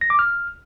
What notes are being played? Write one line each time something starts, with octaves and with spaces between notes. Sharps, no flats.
A#6
D6
F6